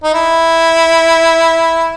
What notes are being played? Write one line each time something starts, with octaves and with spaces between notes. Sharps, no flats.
D#4
E4